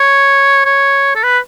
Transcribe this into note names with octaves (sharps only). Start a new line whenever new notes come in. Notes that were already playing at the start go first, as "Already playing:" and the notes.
Already playing: C#5
C#5
A4
B4